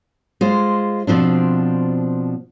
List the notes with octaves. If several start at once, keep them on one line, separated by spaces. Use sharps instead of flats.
G#3 F4 C5
B2 F3 C4 D4